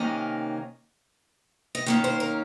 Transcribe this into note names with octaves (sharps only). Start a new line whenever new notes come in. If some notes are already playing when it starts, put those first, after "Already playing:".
Already playing: C3 D#3 A#3 C#4 D#5
D#5
D#3 A#3 C#4 C#5
C5
A#4